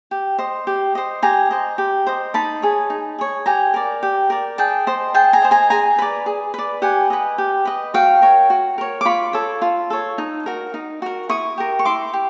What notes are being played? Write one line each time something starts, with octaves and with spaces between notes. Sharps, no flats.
G4
C5 D#5
G4
C5 D#5
G4 G#5 A#5
C5 D#5
G4
C5 D#5
D#4 A5 B5
G#4 C#5
D#4
G#4 C#5
G4 G#5 A#5
A#4 D5
G4
A#4 D5
G#4 G5 A5
C5 D#5
G#4 G5 A5
G#5 A#5
C5 D#5
G#5 A#5
G#4 G#5 A#5
B4 D5
G#4
B4 D5
G4 F#5 G#5
B4 D#5
G4
B4 D#5
F#4 F5 G5
A#4 C#5
F#4
A#4 C#5
D6
F4 B5 C#6
A4 C#5
F4
A4 C#5
D#4
F#4 A#4
D#4
F#4 A#4
E4 C#6 D#6
G4 A#4
C#6
E4 C6 D6
G4